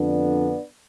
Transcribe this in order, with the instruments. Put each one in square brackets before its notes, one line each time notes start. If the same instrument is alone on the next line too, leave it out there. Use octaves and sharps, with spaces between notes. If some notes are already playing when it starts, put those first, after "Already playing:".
Already playing: [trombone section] F2 D3 B3 D4